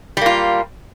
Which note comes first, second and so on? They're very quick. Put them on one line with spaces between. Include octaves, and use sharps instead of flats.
G3 A#3 F4